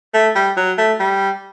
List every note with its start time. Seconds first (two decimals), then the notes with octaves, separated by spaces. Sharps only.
0.14 A3
0.36 G3
0.57 F#3
0.78 A3
1.00 G3